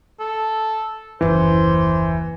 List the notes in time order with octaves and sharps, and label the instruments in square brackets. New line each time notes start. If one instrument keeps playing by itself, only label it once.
[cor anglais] A4
[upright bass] F#1 D#2 [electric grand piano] E3 [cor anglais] C5